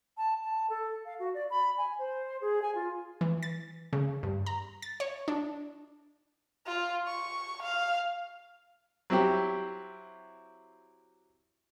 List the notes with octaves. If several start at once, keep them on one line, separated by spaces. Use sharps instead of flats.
A5
A5
A4
F5
F#4
D5
B5
G#5
C5
G#4
G#5
F4
E3
A6
C#3
G2
A#5
A6
C#5
D4
F4
C#6
F5
F#3 C4 E4 G4